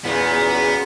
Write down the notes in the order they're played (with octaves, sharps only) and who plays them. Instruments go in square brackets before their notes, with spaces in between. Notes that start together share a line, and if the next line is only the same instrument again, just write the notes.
[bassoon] E2 [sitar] A#2 [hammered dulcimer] C#3 F#3 G#5 [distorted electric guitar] B3 B4